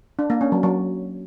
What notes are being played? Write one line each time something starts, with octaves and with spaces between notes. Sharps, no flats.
D4
A#3
C#4
F#3
F#3